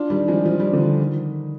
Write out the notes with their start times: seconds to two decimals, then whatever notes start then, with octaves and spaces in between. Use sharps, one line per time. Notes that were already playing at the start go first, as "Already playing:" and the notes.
Already playing: D4 F4
0.10 D#3 G3
0.28 F3 G#3
0.46 F3
0.60 G3
0.73 D3 F3
0.99 D#3